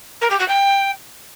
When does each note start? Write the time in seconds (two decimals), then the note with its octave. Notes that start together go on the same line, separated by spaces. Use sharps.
0.21 A#4
0.30 G4
0.39 F#4
0.48 G5